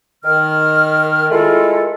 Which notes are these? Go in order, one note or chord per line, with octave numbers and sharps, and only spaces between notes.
D#3 F6
G#3 A3 E4 F4 A4 A#4